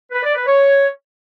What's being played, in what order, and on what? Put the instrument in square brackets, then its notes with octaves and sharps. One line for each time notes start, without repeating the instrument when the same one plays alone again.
[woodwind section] B4
D5
B4
C#5